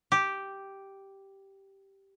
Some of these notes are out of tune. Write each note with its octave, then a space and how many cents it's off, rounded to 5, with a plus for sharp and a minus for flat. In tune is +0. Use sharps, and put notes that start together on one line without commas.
G4 -5